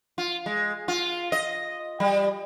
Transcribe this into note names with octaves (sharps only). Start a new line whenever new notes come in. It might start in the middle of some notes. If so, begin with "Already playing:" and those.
F4
G#3
F4
D#5
G3